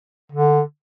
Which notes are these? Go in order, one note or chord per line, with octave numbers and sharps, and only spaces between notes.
D3